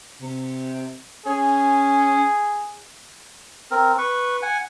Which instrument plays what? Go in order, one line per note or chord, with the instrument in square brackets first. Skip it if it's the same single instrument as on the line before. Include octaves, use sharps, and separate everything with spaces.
[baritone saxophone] C3
[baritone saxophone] C#4 [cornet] G#4
[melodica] C4 A#4
B4 C#6
F#5 G#5